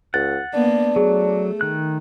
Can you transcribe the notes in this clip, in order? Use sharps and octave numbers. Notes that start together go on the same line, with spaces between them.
C#2 F#5 A6
A#3 B3 D4
F#3 A3 G#4
D#3 F#6